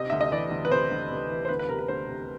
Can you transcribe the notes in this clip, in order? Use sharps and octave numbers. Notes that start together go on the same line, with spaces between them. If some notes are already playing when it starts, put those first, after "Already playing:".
Already playing: C3 D#5
D2 E5
D#5
E3 D5
D2
B4
C3 C5
D2
C3
E3
C5
D2 B4
B4
C3 A#4
B4
D2 C5
C3